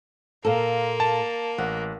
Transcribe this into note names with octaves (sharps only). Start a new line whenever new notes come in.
A#2 A#3 A4
A5
A1 F#5